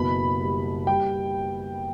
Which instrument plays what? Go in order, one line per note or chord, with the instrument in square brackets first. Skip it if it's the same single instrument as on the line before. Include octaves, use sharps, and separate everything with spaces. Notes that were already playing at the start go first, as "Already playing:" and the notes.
Already playing: [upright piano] F#1 B2 B5
G3
G3 G5